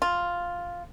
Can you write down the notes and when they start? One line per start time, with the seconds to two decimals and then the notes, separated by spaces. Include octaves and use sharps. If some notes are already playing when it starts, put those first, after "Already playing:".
0.02 F4